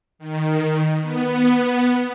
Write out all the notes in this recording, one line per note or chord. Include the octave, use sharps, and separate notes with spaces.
D#3
B3